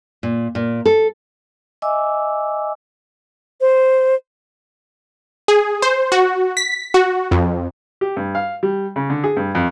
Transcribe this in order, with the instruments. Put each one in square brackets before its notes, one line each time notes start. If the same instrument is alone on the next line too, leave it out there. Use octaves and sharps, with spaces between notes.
[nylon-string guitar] A#2
A#2
A4
[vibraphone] D#5 E5 G#5 D6 E6
[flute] C5
[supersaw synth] G#4
C5
F#4
B6
F#4
F2
[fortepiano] G4
G2
F5
G3
C#3
D3
G#4
G2
F2